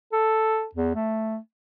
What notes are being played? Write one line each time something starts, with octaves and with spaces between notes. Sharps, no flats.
A4
E2
A3